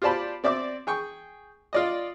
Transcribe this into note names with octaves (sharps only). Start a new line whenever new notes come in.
F4 G4 C5 D5 A5 B5
C4 D5 E5 D6
G#4 G5 C#6
F4 D5 D#5